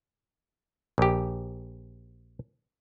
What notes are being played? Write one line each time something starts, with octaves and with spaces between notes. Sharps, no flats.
A#1 G4